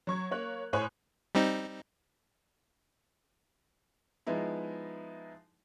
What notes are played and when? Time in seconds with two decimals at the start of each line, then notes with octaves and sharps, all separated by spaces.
0.07 F#3 C#6 G#6
0.31 A#3 C#5 F#6
0.73 A2 C5 C#5 G#5 C#6 F#6
1.35 G3 C4 D#4
4.27 F3 G#3 B3 D#4 E4